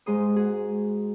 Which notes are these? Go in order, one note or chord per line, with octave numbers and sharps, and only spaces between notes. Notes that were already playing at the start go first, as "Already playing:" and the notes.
G#2 G#3 C6 D#6
F#4 G#4